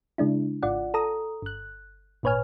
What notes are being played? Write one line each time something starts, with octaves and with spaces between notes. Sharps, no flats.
C#3 G#3 D4 E4
G#1 F4 D5 F#5
A4 A#5 D#6
G1 F#6
G#1 A#2 B4 C#5 G#5 F6